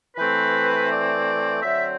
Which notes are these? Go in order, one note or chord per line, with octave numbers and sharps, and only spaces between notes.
E3 A3 C4 B4
D5
D3 F#3 C4 E5